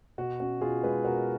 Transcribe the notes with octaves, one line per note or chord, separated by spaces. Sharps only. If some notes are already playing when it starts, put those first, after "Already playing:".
B2 F#4
C#4 F#4
B2 F4 G#4
G#3 G#4 B4
B2 F#4 A#4